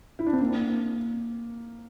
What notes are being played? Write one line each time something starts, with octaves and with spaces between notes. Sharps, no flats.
E4
D4
C4
A#3